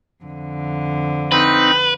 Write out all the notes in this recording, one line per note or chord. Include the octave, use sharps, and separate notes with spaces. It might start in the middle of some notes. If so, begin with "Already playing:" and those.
F2 D3
C4 D#4 B4